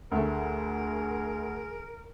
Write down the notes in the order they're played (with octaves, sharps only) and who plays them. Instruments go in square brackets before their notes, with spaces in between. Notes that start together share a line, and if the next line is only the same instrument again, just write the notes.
[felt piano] D2 A3 [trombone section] G#4 [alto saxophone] A#4